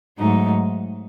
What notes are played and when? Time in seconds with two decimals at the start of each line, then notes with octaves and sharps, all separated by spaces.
0.19 G#2 F#3 A3 D#4